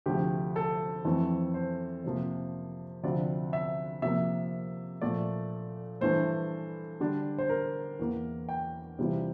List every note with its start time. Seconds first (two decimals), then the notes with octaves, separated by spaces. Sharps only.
0.06 D2 C3 F3 A3 G4
0.56 A4
1.05 F2 E3 A3 C4
1.54 C5
2.04 F2 C3 F3 A#3
3.03 D2 C3 F3 C4 F4 D5
3.53 E5
4.02 C3 F3 A#3 E5
5.02 A#2 F3 A3 D5
6.01 G2 E3 A3 C5
7.00 D3 G3 D4
7.38 C5
7.49 A#4
7.99 E2 E3 A#3
8.49 G5
8.99 C3 E3 G3 C4 F4